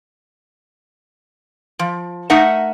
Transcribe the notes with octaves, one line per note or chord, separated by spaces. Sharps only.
F3
A3 D#4 A#4 E5 F#5